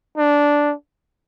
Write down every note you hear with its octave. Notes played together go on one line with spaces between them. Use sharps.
D4